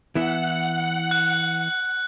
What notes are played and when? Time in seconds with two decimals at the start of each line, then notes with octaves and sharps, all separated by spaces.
0.15 E3 B3 E4 F#5
1.11 F#6